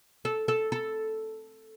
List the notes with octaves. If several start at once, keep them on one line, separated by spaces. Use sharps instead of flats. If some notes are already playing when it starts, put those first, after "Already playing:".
A4
A4
A4